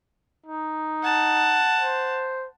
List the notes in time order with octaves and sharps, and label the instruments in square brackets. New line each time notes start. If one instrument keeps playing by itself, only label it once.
[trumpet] D#4
[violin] F#5 A5
[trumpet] C5